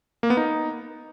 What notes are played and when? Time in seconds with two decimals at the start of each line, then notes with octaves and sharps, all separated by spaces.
0.23 A#3
0.30 B3
0.37 D#4